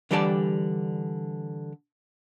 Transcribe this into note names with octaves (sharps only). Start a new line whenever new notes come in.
D3 E3 G3 G4 D5 A5